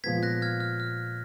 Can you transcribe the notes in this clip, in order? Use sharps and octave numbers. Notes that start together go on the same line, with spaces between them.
A#2 F3 G#3 B3 G#6 B6
F#6 A#6
F6 G#6
F6
F6